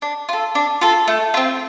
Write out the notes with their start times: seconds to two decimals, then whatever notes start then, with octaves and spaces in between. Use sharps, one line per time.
0.02 D4
0.29 F4 A4
0.55 D4
0.81 F4 A4
1.08 A3
1.34 C4 F4